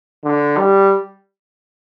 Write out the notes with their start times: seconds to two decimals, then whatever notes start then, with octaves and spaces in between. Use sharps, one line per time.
0.24 D3
0.57 G3